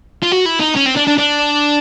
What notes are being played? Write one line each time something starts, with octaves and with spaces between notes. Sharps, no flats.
F4
F#4
E4
D#4
C#4
C4
D4
D4
D4